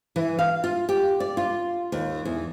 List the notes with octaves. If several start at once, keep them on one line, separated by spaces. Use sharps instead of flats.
E3
F5
F4
G4
D5
F4
D#2
E2